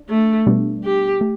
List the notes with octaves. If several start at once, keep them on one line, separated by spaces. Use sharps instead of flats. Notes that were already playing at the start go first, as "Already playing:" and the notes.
Already playing: D4
A3
B2 G3 B3 D4
G4
A3